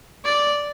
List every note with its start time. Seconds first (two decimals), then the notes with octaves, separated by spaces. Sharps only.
0.25 D5